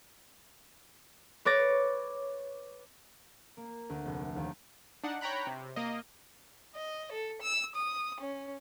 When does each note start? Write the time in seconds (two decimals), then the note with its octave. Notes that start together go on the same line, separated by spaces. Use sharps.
1.45 B4 C#5 D6 A6 A#6
3.57 A#3
3.90 D2
4.05 F1
4.19 A3
4.36 D#2
5.04 D4 D#4 F#5
5.21 C#5 G5 A#5 B5 F#6
5.47 C3
5.76 A#3 D#5
6.75 D#5
7.12 A4
7.42 E6
7.75 D#6
8.21 C#4